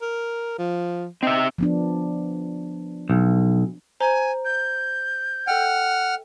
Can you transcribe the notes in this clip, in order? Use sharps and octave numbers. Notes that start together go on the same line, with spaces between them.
A#4
F3
C4 D#4 E5
F3 B3 D4
B1
C5 G#5 A#5 G7
G6
A4 E5 F#5 G5 F6